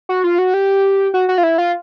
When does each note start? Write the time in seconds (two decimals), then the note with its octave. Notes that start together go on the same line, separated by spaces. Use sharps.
0.09 F#4
0.24 F4
0.38 F#4
0.54 G4
1.14 F#4
1.29 F#4
1.38 F4
1.43 E4
1.58 F4